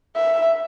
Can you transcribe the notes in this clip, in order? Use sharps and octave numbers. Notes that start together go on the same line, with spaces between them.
E5